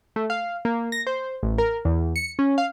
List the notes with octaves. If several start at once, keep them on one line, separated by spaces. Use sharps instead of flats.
A3
F5
A#3
A#6
C5
A1
A#4
E2
C#7
C#4
F5